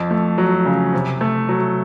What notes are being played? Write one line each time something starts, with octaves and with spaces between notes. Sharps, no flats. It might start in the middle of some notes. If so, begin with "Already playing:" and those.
Already playing: F2
A3
F#3
C#3
C3
A3
F#3